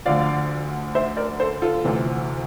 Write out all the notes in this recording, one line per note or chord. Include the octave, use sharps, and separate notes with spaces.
D2 D3 F3 D5 F5
C5 E5
A#4 D5
A4 C5
F4 A4
D2 C3 E3